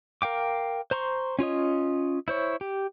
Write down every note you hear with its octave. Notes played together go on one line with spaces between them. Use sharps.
A#4 F5 G5 D6
C5 A#5 C6 C#6
C#4 F4 C#5 D#5
E4 C5 C#5
G4